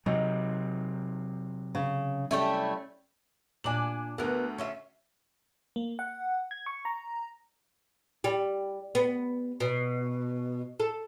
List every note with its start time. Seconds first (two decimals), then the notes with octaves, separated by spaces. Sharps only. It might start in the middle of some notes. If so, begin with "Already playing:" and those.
0.06 C3 F#3 D#4
1.75 C#3
2.31 G3 A3 C#4 E4
3.64 A#2 D4 G#5 D6 F#7
4.18 D2 B3 A#4
4.58 C#4 F4 E5
5.76 A#3
5.99 F#5
6.51 G#6
6.66 C#6
6.85 A#5
8.24 G3
8.95 B3
9.60 B2
10.80 A4